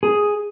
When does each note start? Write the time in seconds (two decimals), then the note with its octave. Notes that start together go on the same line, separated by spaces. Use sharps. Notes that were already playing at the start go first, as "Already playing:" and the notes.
0.03 G#4